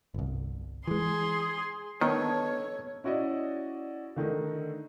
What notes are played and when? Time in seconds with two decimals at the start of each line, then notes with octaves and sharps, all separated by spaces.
0.14 G1 C2
0.87 E3 G#3 G#4 C6
2.01 D#3 B3 D4 A4 C#5 D#5
3.04 C#4 E4 F#4 D5 D#5
4.16 D3 D#3 A3 D#4